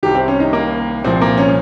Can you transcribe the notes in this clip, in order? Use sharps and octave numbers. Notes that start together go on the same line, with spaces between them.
C2 C3 D#3 G4
C4
C#4
D#4
A#3
C2 A#2 F3 C4
A#3
C#4